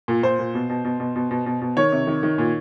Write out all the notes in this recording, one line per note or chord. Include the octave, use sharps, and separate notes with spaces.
A#2
A#2 C5
A#2
B2
B2
B2
B2
B2
B2
B2
B2
D#3 C#5
C3
D#3
D#3
A#2